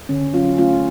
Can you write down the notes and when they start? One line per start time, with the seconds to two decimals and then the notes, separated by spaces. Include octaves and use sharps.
0.09 D3 C#4
0.34 F#3 C#4 F4
0.58 A3 C#4 F4